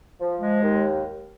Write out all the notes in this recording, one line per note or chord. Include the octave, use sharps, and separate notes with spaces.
F3
G#3
D#2